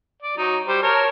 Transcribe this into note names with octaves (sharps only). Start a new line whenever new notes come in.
D5
F#3 D#4
G3 C5
A#4 C#5 A5